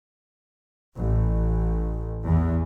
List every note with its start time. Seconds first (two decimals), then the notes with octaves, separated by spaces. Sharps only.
0.97 A1
2.25 E2